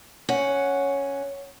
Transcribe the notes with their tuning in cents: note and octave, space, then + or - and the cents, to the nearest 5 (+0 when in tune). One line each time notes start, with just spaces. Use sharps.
C#4 +0 F#5 +0